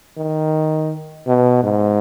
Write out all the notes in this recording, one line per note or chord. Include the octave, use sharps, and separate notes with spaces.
D#3
B2
G#2